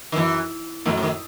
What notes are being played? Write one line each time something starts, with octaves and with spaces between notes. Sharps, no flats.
D#3
F#2 E3
F#2 A2 D#3
C3
D#3